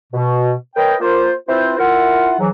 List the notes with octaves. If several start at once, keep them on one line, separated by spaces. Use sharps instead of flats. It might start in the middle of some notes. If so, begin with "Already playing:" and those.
B2
A#4 B4 C#5 D#5 G5
A#3 F4 C5
C4 E4 F4 B4 C5
E4 F4 A#4 F#5
G#2 E3 F#3